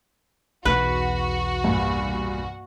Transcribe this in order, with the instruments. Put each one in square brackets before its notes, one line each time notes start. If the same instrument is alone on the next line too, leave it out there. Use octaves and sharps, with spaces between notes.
[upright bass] B1 E2 [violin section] F#4 [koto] B4
[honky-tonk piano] G2 A#2